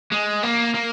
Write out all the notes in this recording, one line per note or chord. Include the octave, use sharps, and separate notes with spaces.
G#3
A#3
A#3